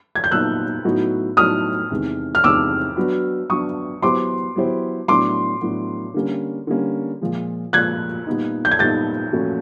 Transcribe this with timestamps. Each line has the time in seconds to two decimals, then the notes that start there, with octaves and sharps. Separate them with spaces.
0.15 G#6
0.24 G6
0.31 A#2 F#3 B3 D#4 E6 F#6
0.85 A2 F#3 B3 D#4 F#4
1.37 A2 F#3 B3 D#4 F#4 D#6 F6
1.91 E2 C3 D#3 G#3
2.35 F6
2.44 E2 C3 D#3 G#3 D6 E6
2.96 F#3 B3 D4 F#4 B4
3.50 F#3 B3 D4 F#4 B4 C#6 D#6
4.02 F#3 B3 E4 G4 C5 C6 D6
4.56 F#3 B3 E4 G4 C5
5.08 A2 F#3 B3 D4 C6 D6
5.61 A2 F#3 B3 D4
6.14 D3 G3 A#3 C#4
6.67 D3 G3 A#3 C#4
7.21 A#2 F3 G#3
7.73 A#2 F3 G#3 F#6 G#6
8.26 A#2 G3 B3 D#4
8.65 G6
8.71 G#6
8.79 A#2 G3 B3 D#4 G6 A6
9.32 A#2 F3 A3 C#4 F#4